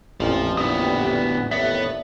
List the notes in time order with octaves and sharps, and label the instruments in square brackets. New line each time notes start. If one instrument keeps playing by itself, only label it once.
[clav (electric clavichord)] A1 F2 A#2 [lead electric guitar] F3
[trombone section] A#1 G3 [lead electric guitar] A2 D3 [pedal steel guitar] B3 D#6
[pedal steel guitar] B3
[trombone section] D#2 A2 [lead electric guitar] B3 [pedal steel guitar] D5 E5